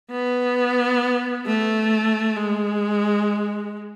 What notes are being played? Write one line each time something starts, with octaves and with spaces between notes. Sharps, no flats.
B3
A3
G#3